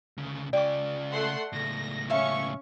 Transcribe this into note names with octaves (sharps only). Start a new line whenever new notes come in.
D2 C#3
C#3 F4 D5 G5 D6
A3 F#5 C6
C#2 A2 A#6
C#4 E5 F5 C#6